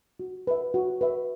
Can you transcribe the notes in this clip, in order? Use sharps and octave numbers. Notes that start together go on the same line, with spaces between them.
F#4
B4 E5
F#4
B4 E5